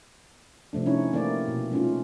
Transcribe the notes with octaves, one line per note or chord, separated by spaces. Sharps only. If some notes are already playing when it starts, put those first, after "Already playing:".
C3 F3 A3 D4
C#4 D#4 E4 C#5
E3 A3 A#3 C4 E4 D5
B2
G#3 A3 C#4 D#4 F4